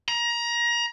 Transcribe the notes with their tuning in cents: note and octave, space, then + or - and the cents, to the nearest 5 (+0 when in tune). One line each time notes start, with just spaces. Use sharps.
A#5 +25